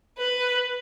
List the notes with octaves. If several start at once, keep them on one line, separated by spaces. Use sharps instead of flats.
B4